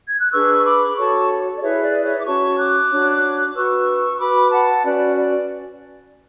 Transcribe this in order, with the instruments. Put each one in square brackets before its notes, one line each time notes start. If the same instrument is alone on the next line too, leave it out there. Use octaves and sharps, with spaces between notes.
[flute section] G#6
F#6
D4 G#4 B4 C#6 E6
C#6
B5 D6
F#4 A4 C#5 A5 C#6
D5
E4 G#4 B4 C#5 E5
D5
C#5 E5
D6
C#4 F#4 C#5 A5 C#6
D6 F#6
D4 F#4 C#5
F#4 B4 C#6 E6
E6
F#4 B4 B5 D6
F#5 A5
C#4 F#4 B4 D5
D5